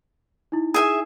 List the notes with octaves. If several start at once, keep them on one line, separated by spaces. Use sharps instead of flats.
D#4 E4
G#4 E5 G#5